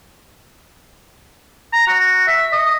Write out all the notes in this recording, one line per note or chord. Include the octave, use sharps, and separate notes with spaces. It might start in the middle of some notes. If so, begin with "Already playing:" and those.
A#5
F#4
E5
D#5